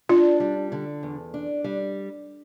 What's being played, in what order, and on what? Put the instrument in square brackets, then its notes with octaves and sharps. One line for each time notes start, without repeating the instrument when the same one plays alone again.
[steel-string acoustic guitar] D4 [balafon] F4
[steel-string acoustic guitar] G3
D3
E2
D4
G3